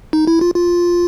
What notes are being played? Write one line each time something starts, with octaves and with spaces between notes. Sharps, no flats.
D#4
E4
F4
F4